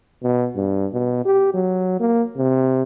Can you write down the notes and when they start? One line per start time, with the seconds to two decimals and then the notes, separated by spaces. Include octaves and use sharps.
0.23 B2
0.56 G2
0.93 B2
1.25 G4
1.54 F#3
2.00 A#3
2.37 C3